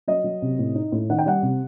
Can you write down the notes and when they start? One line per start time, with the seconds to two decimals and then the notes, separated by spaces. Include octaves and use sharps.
0.08 F#3 D#5
0.24 F#3
0.42 C3
0.59 A2
0.75 D#4
0.92 A2
1.10 D#3 F#5
1.19 G5
1.26 G3 F#5
1.43 C3